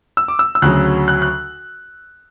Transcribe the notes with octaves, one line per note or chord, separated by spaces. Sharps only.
E6
D6
E6
E6
D2 C#3 F#3 F#6
F#6
F#6